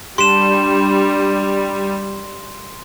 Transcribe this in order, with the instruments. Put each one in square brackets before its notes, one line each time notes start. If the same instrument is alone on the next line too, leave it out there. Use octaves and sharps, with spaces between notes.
[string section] G3 [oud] D4 G4 [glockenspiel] C6 E7